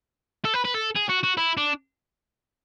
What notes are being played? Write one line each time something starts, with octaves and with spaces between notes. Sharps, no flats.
A4
B4
B4
A4
G#4
F#4
F#4
E4
D4